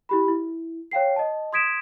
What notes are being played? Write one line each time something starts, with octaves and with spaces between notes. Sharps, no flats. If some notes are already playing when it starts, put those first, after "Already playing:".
E4 G4 B5
E4
C#5 F5 G5 C7
D#5 A5
C6 D#6 G#6 B6 D7 E7